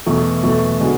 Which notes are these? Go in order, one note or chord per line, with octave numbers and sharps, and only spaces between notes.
E2 B2 A3
E2 B2 A3
D3 G#3 B3 F#4